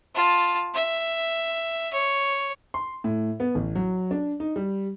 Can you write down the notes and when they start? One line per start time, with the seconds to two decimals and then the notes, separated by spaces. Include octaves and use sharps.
0.15 F4 A5
0.75 E5
1.93 C#5
2.74 C6
3.04 A2
3.40 B3
3.55 A1
3.75 F#3
4.11 D4
4.40 D#4
4.56 G3